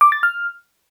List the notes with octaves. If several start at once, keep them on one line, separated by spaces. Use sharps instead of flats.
D6
A6
F6